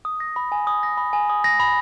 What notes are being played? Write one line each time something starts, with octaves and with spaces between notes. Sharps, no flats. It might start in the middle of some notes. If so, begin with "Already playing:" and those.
D#6
A#6
B5
G#5
D#6
A#6
B5
G#5
D#6
A#6
B5